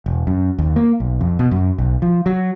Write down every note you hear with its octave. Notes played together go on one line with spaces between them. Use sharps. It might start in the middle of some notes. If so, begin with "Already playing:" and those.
E1
F#2
D#2
A#3
B1
F2
B2
F#2
B1
F3
F#3